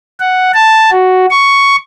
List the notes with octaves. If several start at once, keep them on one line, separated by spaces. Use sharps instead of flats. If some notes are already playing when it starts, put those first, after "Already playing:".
F#5
A5
F#4
C#6